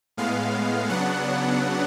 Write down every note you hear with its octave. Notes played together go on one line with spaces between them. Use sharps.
A2 G#3 B3 F5
C#3 F#3 B3 D4 F#5